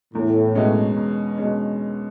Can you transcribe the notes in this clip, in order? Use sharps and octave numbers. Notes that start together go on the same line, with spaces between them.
E2 A2
B2 G#3 C#4
E2
B2 G#3 C#4